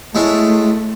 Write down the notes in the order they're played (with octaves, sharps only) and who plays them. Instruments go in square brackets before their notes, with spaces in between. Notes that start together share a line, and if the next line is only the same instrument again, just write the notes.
[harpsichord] A2 G#3 E5 [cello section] A3